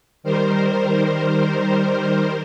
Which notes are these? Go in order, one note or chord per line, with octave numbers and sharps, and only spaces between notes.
D#3 G3 A#4 C5